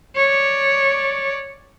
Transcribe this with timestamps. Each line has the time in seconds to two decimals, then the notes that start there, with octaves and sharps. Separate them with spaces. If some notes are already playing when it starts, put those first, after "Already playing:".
0.16 C#5 D5